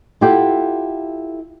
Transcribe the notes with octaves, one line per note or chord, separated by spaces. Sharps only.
E4 F4 G4 A4 F#5